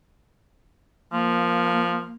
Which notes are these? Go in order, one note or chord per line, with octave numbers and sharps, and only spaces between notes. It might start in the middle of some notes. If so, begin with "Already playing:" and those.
F3 A#3